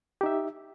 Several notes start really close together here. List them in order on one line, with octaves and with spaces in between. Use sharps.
G4 D#4 E5